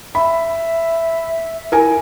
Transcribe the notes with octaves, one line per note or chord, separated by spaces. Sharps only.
E5 B5
E4 A#4 G#5